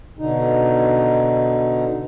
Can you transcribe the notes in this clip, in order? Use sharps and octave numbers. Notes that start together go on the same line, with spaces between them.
B2 D3 D#4